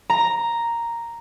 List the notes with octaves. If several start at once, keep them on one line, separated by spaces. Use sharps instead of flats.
A#5